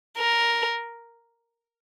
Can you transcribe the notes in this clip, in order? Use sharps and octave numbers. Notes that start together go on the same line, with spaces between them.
A#4